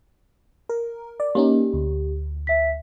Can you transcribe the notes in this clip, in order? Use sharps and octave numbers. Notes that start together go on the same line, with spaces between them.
A#4
D5
A#3 C#4 D#4 G4
D2
E5 B6